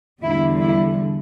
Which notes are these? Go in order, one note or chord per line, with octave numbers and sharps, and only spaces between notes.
E2 D3 G3 E4
E4